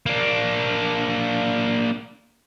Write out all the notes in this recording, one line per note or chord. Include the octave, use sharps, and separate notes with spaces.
A#3 D4